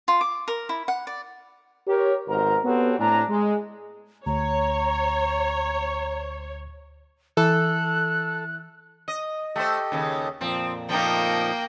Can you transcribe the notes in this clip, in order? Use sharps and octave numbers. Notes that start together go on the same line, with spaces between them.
F4
D6
A#4
E4
F#5
D5
G4 A#4 C#5
G#1 B2 A#4 C5 A#5
B3 C4 F#4 G4 A4 C#5
A2 C4 D4 G#5 A#5
G#3
D2 C#5 A#5
E3 A4 F#6
D#5
A3 G4 A4 C5 D#5
D#2 C#3
F2 A#2 F3 C4
F3 A3 A#3 D#4 G5